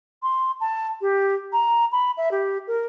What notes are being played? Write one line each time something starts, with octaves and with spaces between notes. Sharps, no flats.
C6
A5
G4
A#5
B5
E5
G4
A#4